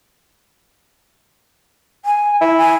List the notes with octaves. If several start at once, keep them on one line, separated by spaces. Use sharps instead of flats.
G#5
E4
G#5